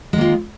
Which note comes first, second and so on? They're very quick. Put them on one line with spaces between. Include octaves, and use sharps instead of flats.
G#3 D#3 A#3 F4